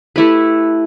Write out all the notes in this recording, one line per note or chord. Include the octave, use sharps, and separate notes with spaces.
A3 E4 G4 B4